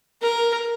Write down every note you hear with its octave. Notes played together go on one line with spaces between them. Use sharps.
A#4